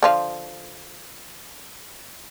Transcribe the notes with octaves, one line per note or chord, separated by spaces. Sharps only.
D3 F3 F5